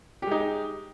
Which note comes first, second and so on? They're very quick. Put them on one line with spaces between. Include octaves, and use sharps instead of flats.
G4 G#3 D#4